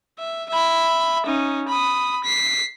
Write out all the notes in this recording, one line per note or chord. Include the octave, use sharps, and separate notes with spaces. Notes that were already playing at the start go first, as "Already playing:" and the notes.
E5
E5 B5
C#4 D#4
B5 D#6
B6 C7